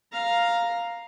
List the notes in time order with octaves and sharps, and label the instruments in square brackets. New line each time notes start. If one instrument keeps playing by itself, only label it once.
[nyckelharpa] F5 A#5